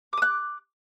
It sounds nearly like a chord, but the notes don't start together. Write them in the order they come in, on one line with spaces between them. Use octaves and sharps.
D6 D#6 F#6